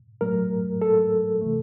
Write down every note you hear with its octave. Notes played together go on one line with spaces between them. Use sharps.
A2 F#3 A3 A#4
A4
C3 E3 A3